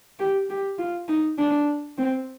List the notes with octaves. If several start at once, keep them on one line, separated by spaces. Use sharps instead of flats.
G4
G4
F4
D#4
D4
C4